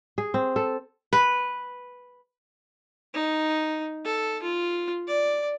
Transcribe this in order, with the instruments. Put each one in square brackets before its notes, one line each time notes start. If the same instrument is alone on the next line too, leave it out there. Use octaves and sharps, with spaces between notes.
[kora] G#4
C4
A4
B4
[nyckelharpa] D#4
A4
F4
D5